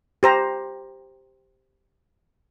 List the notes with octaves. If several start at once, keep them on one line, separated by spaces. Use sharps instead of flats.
G4 C5 A#5